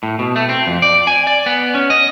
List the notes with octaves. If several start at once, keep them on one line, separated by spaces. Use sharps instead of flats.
A2
B2
A3
C4
F2
D5
G#5
D5
B3
C#4
D#5